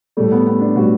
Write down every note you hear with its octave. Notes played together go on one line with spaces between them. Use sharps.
A2 G3 A3
B3
B3
D4
A2 G3 F#4